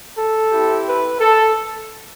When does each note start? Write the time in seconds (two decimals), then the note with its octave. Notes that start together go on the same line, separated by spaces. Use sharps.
0.17 A4
0.51 C4 E4 G4
0.86 B4
1.20 A4